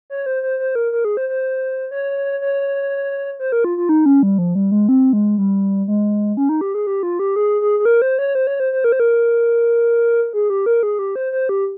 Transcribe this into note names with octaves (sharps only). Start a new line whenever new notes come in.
C#5
C5
C5
C5
A#4
A#4
G#4
C5
C5
C#5
C#5
C5
A#4
F4
F4
D#4
C#4
G3
F3
G3
G#3
C4
G#3
G3
G#3
C#4
D#4
G4
G#4
G4
F4
G4
G#4
G#4
G#4
A#4
C5
C#5
C5
C#5
C5
C5
A#4
C5
A#4
G#4
G4
A#4
G#4
G4
C5
C5
G4